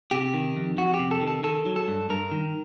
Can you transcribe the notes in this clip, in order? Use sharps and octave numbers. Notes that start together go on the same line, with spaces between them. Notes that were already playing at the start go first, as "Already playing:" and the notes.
C3 G4
D#3
F2
F2 F#4
G4
C3
A4
D#3
A4
D#3 A4
F#3
A4
G2
G2 A#4
D#3